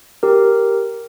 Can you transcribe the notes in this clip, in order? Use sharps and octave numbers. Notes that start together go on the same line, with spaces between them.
G4 A#4